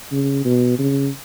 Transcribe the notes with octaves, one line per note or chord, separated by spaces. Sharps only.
C#3
B2
C#3